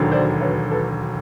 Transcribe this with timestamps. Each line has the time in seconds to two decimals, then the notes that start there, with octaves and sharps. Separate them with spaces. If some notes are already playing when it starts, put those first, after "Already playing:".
Already playing: E1 D#2 D3 F#3
0.12 C5 D5
0.41 B4 C#5
0.71 A4 B4